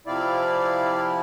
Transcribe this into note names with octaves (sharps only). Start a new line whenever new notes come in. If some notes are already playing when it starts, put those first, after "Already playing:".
C3 F3 C4 E4 D5 F5